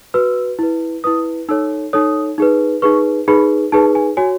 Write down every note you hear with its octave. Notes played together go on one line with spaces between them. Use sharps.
F#4 B4 E6
E4 B4
E4 B4 D#6
D#4 A4 C#5 E6
D#4 A4 C#5 D#6
D#4 G#4 B4
D#4 G#4 B4 C#6
D#4 G#4 B4 B5
D#4 G#4 B4 A5
G#5
F#4 C#5 G#5